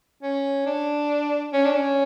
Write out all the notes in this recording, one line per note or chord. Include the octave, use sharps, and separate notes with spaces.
C#4
D4
C#4
D4
C#4